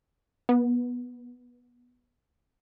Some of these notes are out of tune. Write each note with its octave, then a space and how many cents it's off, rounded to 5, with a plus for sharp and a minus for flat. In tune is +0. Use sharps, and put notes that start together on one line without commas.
B3 -15